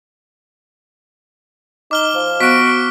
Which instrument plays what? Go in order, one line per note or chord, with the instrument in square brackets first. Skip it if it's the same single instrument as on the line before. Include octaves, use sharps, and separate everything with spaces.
[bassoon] D#4 [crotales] D6 F6 G7
[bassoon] F3
[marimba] B3 [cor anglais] F#4 [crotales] B6 D7